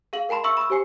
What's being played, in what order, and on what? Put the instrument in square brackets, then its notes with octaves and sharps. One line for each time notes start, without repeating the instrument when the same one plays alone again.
[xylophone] G#4 F5 F#7
A#4 G5 A5 B5 C6
E5 B5 C#6 E6 C#7
B5 C#6 D#6 E6
G4 C5 G#5 C7